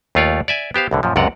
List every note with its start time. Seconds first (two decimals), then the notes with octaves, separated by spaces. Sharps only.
0.15 D#2 A3 F4 C#5 D5
0.48 D5 E5 G#5
0.74 B3 G4 C5 F5
0.91 C2 A2 D3
1.03 F#2 A#2 F3
1.16 C#2 F#2 C3 D5 F#5 A#5